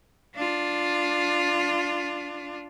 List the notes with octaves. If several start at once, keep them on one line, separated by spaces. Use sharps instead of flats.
D4 F4